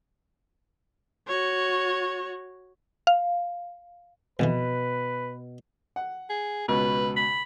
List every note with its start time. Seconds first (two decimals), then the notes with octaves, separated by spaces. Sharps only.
1.28 F#4 C#5
3.07 F5
4.39 C2 F2 B2 E3 B4
5.96 F#5
6.29 G#4
6.68 C#2 B2 B4
7.16 B5